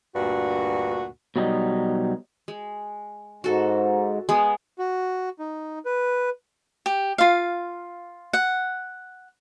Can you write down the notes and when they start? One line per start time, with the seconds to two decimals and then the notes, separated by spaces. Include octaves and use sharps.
0.15 D2 G2 A#2 F#4
1.36 B2 F#3 G3 D#4
2.48 G#3
3.44 G#2 F#4 A4
4.29 G#3 B3
4.79 F#4
5.39 D#4
5.85 B4
6.86 G4
7.18 F4 F5
8.33 F#5